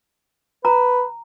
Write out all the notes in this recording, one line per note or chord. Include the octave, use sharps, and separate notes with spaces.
B4 A#5